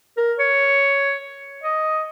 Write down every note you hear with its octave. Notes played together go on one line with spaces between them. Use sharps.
A#4
C#5
D#5